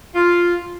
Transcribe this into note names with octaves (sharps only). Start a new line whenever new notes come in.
F4